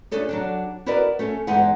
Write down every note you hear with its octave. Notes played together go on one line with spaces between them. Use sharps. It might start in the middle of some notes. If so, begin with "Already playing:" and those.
A3 C#4 D4 G#4 A4 C#5
F#3 G3 D4
E4 F#4 A#4 B4 D5 D#5
A3 C#4 A4
E2 G2 G#3 D#4 E4 F#5